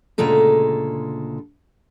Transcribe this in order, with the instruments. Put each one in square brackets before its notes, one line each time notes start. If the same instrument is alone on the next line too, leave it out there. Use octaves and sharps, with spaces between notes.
[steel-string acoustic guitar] D2 A#2 C#3 G#3 A4 A#5